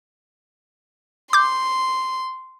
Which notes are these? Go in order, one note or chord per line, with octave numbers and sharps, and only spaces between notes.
C6 D6 G6